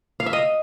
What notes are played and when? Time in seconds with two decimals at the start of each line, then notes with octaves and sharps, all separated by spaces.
0.20 F5
0.26 E5
0.33 D#5